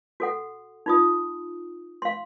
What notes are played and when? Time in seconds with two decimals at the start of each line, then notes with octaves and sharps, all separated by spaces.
0.20 F#4 A4 F#5
0.86 D#4 F4 D#6
2.02 F5 C6